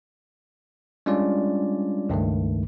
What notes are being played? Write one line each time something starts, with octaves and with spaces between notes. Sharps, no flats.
G3 G#3 C#4 D4 F4 D5
C#2 G2 D#3 A3